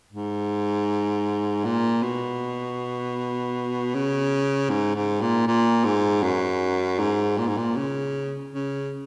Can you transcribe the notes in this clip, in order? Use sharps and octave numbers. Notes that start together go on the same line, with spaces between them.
G#2
A#2
B2
C#3
G#2
G#2
A#2
A#2
G#2
F#2
G#2
A#2
G#2
A#2
C#3
C#3